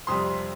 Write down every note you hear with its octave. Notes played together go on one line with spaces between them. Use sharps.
F2 C3 G3 C6 D#6